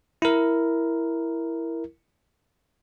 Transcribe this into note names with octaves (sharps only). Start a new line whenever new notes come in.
E4 A#4